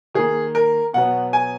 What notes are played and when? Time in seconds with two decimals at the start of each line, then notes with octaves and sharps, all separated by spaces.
0.15 D#3 A#3 G#4
0.55 A#4
0.93 B2 F#3 B3 F#5
1.33 G#5